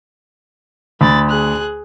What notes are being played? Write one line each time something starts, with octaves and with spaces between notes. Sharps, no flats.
D2 B5 A6
G#4 F#6